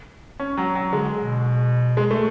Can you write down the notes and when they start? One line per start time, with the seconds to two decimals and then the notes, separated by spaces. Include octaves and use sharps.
0.40 C#4
0.57 F#3
0.75 F#3
0.92 D3 G#3
1.18 B2
1.97 G#3
2.11 A3